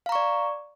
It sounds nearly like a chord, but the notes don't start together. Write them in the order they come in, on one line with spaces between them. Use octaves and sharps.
F5 A#5 C#6 D5